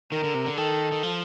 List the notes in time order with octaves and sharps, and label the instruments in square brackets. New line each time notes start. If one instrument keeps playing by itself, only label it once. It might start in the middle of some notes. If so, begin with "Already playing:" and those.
[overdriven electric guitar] D#3 [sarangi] A#4
[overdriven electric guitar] D3
C3
D3
[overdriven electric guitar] D#3 [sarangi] A4
[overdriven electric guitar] D#3
F3